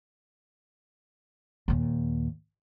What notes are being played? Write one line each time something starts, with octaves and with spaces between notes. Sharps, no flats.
D#2 A#2